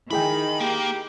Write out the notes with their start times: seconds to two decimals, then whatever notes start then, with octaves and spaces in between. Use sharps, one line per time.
0.11 D#3 E4 G#4 G5 B5
0.60 A#3 G4